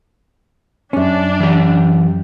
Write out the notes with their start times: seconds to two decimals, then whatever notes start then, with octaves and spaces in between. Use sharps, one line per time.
0.93 F#2 C#4 D4
1.40 E3 G4